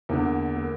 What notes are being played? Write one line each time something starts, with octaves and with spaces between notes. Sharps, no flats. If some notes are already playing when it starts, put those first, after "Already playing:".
E2 D3 A#3
A#3